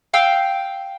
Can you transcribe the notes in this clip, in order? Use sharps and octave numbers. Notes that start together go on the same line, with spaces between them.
F5 G5 E6